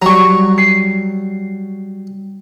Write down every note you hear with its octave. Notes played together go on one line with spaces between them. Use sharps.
F#3 G3 A#5 C#6
C7